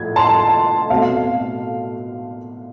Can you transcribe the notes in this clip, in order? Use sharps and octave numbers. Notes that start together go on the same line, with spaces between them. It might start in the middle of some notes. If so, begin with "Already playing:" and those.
Already playing: A2 F3 G#6
A5 C6
B2 A3 C4 F5